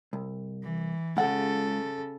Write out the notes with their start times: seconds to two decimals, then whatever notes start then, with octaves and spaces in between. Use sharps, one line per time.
0.13 C2
0.63 E3
1.17 C#2 C#3 A4 F#5